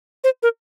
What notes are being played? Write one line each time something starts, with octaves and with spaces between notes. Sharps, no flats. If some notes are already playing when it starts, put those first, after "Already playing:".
C5
A#4